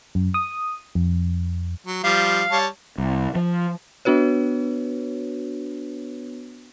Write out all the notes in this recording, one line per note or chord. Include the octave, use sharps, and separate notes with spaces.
F#2
D#6
F2
F#3
F3 G3 F5
G3 C#5 A5
C2
F3
B3 D4 F#4 B4 C#5